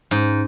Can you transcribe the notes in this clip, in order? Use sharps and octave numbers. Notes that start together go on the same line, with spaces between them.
G#2 C#4